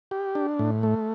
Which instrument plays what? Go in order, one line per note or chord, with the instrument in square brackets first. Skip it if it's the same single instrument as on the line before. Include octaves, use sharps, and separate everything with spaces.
[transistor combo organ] G4
D4
A2
A3